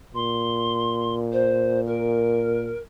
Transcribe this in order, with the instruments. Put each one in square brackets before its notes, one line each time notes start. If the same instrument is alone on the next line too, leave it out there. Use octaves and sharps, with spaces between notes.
[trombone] A#2 [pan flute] C6
[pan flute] C5
A#4